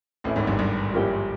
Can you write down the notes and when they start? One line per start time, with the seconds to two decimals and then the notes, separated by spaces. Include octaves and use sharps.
0.24 A1 A2 E3 A3 C#4 E4
0.36 G#1 G#2
0.47 G1 G2
0.59 G1 G2
0.93 F3 A#3 C#4 E4 G4